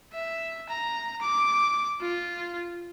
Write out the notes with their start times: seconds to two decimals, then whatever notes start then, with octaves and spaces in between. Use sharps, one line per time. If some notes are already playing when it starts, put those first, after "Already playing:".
0.13 E5
0.69 A#5
1.21 D6
2.00 F4